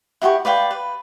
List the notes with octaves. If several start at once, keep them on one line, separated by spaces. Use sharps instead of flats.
E4 F#4 G4 C#6
B4 D5 F5 G5
B4